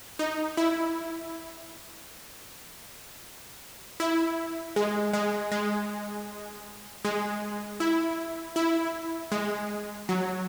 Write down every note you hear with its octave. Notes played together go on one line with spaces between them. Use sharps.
D#4
E4
E4
G#3
G#3
G#3
G#3
E4
E4
G#3
F#3